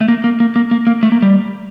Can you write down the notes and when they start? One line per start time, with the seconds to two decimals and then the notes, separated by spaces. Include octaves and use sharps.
0.01 A3
0.08 A#3
0.24 A#3
0.40 A#3
0.56 A#3
0.71 A#3
0.87 A#3
1.03 A3
1.12 A#3
1.22 G3